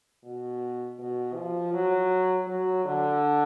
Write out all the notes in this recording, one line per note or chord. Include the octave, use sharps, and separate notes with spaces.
B2
B2
F3
F#3
F#3
D3